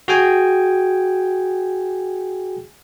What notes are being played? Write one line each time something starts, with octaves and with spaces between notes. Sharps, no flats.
F#4 G#4 G5 G#5